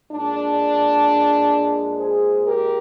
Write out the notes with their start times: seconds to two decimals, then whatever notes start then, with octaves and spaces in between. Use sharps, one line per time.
0.11 A#2 G#3 D4
1.99 G#4 C5
2.46 G4 A#4